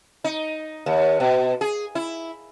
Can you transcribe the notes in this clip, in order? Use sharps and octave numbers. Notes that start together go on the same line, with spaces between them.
D#4
D#2
B2
G#4
E4